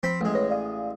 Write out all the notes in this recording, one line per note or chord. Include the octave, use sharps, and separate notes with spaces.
F3 C4 C5 B5
A1 G#3
B4 C#5 A#6
D5 F5 D#6